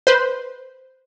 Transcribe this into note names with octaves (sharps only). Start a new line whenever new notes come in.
B4 C5